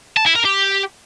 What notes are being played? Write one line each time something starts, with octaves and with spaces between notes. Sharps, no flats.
A5
E4
A#4
G4